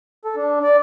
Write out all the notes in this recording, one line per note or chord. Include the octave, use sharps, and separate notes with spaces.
A4
D4
D5